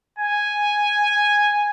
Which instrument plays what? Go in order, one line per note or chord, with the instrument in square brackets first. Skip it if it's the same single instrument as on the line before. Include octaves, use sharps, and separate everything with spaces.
[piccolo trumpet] G#5